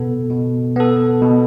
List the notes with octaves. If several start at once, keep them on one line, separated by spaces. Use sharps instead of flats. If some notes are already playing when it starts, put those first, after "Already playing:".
Already playing: B2 B3 A4
B2
B3 A4
B2